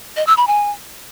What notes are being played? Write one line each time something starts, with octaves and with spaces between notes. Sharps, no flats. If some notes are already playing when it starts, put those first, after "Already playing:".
D#5
E6
B5
G#5